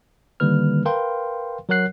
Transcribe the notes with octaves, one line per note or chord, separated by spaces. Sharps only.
D3 D#3 G3 A#3 B4 F6
A#4 B4 F5 G5 C6
F#3 A#4 C#5 F#5 F#6 C7